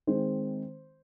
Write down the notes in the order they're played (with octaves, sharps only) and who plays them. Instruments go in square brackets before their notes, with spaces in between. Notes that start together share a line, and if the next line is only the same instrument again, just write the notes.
[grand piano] D#3 G#3 C4 C5